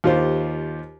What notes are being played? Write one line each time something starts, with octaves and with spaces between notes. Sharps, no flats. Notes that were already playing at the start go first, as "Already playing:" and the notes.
D#2 F4 G4 C5